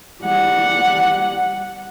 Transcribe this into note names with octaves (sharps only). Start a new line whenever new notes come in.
G3 F#5